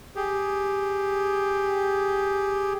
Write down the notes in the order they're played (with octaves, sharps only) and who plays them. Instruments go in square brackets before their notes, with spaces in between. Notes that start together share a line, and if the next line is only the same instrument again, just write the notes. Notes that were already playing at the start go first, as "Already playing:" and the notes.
[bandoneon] G4 G#4